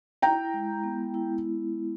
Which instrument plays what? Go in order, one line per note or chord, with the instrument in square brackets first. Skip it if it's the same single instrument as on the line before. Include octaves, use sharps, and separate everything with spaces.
[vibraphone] E4 [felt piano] G5 A#5
[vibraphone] G#3
B3
E4